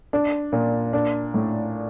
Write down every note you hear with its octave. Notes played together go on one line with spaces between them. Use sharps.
D4
A#2
D4
A2